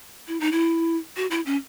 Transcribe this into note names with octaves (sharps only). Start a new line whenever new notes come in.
E4
D#4
E4
F#4
E4
C#4